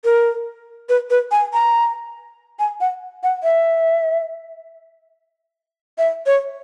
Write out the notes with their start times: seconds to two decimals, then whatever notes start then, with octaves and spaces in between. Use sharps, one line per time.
0.04 A#4
0.89 B4
1.10 B4
1.31 G#5
1.53 A#5
2.59 G#5
2.81 F#5
3.23 F#5
3.43 E5
5.98 E5
6.26 C#5